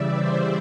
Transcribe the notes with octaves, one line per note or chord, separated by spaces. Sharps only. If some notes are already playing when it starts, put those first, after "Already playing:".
Already playing: C#3 E3 G3 D5 E5
C5 D5